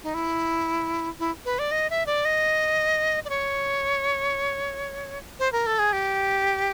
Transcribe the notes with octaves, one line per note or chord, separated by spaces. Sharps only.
D#4
E4
E4
B4
D5
D#5
E5
D5
D#5
D5
C#5
C5
A#4
A4
G#4
G4